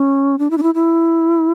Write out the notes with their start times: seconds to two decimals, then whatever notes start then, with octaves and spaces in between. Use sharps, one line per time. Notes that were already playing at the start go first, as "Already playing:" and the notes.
Already playing: C#4
0.39 D4
0.50 E4
0.58 D4
0.63 E4
0.74 E4